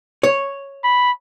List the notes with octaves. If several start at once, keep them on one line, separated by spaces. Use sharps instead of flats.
C#5
B5